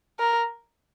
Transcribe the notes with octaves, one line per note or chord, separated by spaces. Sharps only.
A#4